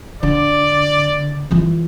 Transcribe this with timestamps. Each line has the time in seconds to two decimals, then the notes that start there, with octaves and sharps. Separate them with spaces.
0.23 D3 D5
1.51 E3 F4